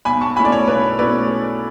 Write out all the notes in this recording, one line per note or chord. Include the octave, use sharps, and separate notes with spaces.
B1 G#5 B5
A5 C#6
B2 A3 C#4 E4 G#5 B5
D5
C#5
B1 B4
B2 A3 C#4 E4 B4 D5